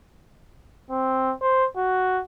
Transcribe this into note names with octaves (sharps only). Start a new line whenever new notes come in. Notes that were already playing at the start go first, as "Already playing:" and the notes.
C4
C5
F#4